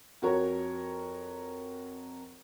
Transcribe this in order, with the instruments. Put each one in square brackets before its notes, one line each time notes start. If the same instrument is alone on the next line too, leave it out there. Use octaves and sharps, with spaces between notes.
[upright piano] F2 F#4 A#4 C#5